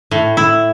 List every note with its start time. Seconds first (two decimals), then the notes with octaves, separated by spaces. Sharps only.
0.11 A2
0.37 E4